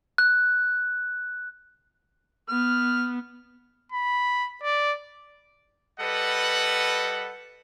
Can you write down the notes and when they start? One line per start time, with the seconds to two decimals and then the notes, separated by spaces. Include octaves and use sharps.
0.18 F#6
2.49 B3 F6
3.92 B5
4.63 D5
6.00 G3 A4 B4 D#5 F#5